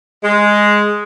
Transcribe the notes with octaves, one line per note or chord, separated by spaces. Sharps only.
G#3